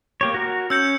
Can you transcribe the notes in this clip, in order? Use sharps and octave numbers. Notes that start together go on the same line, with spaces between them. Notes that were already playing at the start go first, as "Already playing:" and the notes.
A#3 G4 C#5
F#4 A#4
C#4 E6 G6 C#7